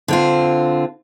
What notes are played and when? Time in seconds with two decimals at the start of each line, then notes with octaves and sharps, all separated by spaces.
0.08 D3 C4 F4